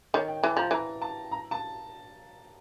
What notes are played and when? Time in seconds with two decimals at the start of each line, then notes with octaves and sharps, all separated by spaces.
0.14 D#3 C#5
0.28 G5
0.43 E3 A5
0.57 F3 A#5
0.71 E3 A#5
1.02 A5
1.31 A#5
1.51 A5